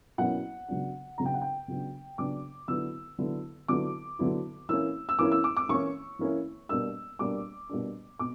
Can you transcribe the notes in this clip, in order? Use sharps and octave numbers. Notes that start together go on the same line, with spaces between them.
B2 F#3 A#3 C#4 E4 F#5
C#3 F#3 B3 D4
C#3 F#3 B3 D4 A#5
G5
F#5
G5
C#3 F#3 B3 D4
C#3 F#3 B3 D4 D6
D3 F#3 B3 E4 E6
D3 F#3 B3 E4
D3 F#3 B3 E4 D6
D3 F#3 B3 E4
E3 A#3 C#4 E4 E6
E6
E3 A#3 C#4 E4 D6
E6
D6
D6
E3 A#3 C#4 E4 C#6
E3 A#3 C#4 E4
B2 G3 A#3 D4 E6
B2 G3 A#3 D4 D6
B2 G3 A#3 D4
B2 D6